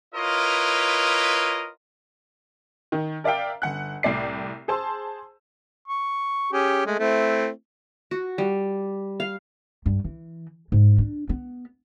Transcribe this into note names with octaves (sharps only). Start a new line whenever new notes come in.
E4 F4 A#4 B4 C#5 D#5
D#3
A#4 D5 E5 F5 G5
G1 F#5 F#6
C2 A2 D5 C7
G#4 C5 A5 C6 E6
C#6
C#4 G4 G#4
G#3 A3
A3 C4 E4
F#4
G3
F5
G2
E3
G#2
D4
B3